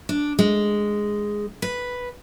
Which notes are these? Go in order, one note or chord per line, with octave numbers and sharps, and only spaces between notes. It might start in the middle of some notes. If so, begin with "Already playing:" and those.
D4
G#3
B4